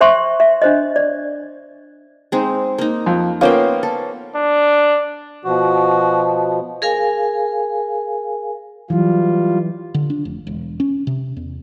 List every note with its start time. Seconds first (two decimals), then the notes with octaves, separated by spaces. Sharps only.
0.01 C5 E5 G5 C6 C#6
0.40 E5
0.62 D4 C5 D#5
0.96 D5
2.32 G#3 C4 D#4
2.78 A#3 D#4
3.06 F2
3.41 A#3 B3 C#4 F4 C5 G5
3.83 A4
4.36 D4
5.45 B2 F3 F#4
6.82 G#4 A#4 F5 G#5
8.90 E3 F#3 G3 F4
9.94 D3
10.10 D4
10.25 F1
10.47 E1
10.80 C#4
11.07 C3
11.37 E2